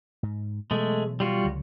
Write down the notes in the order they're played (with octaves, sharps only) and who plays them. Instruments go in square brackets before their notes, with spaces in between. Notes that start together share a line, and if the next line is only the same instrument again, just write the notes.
[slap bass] G#2
[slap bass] B2 E3 F#3 [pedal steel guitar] G#3 A3
[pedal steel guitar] G3 F4 F#4
[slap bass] C#2 D3 F#3